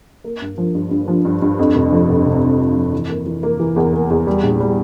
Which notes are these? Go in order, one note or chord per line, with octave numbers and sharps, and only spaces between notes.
A#3
G2
F3
G2
G2
F3
G2
G2
F2
F1
F3
F1
C3
C3
F2
F3
E3
A#3
E3
A#3
E3
E2
A#3
E2
G3
A#1
G3